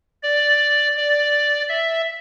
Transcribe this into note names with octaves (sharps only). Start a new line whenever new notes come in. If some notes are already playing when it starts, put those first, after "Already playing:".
D5
D5
E5